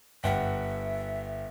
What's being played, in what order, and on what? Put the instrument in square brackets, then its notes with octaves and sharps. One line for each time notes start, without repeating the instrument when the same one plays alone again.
[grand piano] G1 F#5 G5 [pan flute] E5